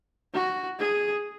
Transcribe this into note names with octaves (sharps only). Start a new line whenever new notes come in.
F#4
G#4